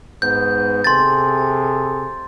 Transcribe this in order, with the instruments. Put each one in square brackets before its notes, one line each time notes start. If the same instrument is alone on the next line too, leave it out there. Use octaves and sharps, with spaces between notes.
[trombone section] G#2 B3 [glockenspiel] G6
[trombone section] C3 G#4 A4 [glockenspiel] C6 A6